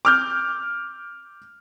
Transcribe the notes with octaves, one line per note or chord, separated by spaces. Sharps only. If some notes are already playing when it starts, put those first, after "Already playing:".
D6 F6 G6